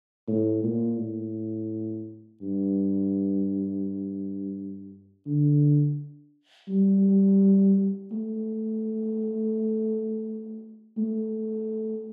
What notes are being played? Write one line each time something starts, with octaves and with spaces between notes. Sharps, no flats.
A2
A#2
A2
G2
D3
G3
A3
A3